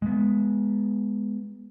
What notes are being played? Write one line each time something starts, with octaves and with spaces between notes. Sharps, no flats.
G#3 B3